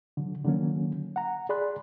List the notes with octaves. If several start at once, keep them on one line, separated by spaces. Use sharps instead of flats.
D3 F#3
D3 D#3 F#3 A#3 C#4
F#5 A#5
G#4 D5 B5 C6 F#6